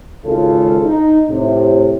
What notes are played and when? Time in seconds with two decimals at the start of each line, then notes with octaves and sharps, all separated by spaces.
0.25 G#1 C#3 F4 A4
0.85 D#4
1.29 A2 C3